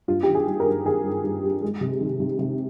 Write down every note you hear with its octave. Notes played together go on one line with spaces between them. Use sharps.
G2 F4
D#3 G4
G#4
G3
A#4
G2
D#3 G#4
G2
G2
G3
G#3
C3
D#3
C3
C3